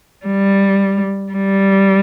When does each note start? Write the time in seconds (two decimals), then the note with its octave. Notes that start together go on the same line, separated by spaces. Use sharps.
0.26 G3
1.32 G3